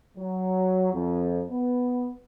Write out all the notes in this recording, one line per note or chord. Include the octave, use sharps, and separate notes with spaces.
F#3
F2
B3